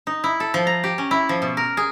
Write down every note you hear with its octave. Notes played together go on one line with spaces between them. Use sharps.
D#4
E4
A4
F3
A#5
G4
C#4
E4
F3
B2
A#4
G#4